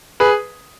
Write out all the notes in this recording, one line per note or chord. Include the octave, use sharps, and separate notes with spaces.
G#4 B4